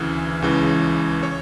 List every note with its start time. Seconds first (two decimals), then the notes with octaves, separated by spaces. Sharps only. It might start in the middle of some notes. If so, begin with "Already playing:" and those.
Already playing: D2 C#3 E3
0.42 C#2 C#3 E3
1.23 C#5